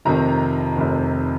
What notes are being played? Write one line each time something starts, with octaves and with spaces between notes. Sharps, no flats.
F1 F2 C3 D#3 A#5
F1 F2 C3 D#3